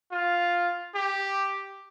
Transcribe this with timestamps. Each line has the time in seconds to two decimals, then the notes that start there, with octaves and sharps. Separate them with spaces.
0.11 F4
0.95 G4